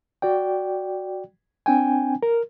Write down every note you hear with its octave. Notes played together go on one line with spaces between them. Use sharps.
F#4 D5 G5
C4 D4 G5 G#5
A#4